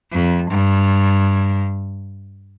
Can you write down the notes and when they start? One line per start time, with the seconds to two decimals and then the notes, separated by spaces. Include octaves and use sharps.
0.12 F2
0.51 G2